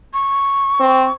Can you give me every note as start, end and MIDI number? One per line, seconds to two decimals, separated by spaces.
0.13 1.12 85
0.80 1.07 60